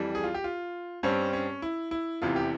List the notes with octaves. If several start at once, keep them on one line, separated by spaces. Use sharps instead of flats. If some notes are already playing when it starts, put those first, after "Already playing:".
Already playing: F2 E3 G3
G#4
F4
G4
F4
G2 G3 C4 C#4
C#4
E4
E4
F1 E2 C3 E3 F4
G4